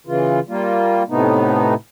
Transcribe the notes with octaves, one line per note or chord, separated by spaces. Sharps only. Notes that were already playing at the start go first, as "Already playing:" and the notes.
C#3 E3 F4
G3 A#3 F4
A2 C3 A3 B3 D#4